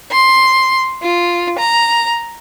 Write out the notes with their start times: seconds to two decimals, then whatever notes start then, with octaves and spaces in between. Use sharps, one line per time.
0.12 C6
1.03 F4
1.59 A#5